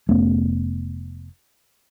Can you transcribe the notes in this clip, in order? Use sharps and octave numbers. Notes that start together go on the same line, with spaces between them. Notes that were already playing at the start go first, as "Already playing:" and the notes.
F1 A3 B3 C#4